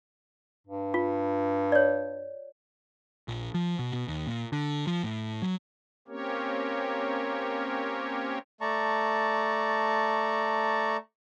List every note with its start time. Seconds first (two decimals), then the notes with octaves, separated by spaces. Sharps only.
0.67 G2
0.94 F4
1.72 C#5 D5
3.28 A#1
3.54 F3
3.79 B2
3.93 B2
4.08 D#2
4.27 A#2
4.52 D3
4.87 F3
5.03 A2
5.42 F#3
6.08 A#3 C4 C#4 G4 A#4 C#5
8.61 A3 D5 A5 A#5 C#6